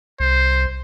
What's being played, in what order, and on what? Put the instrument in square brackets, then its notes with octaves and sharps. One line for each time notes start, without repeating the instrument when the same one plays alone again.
[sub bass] C2 [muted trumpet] C5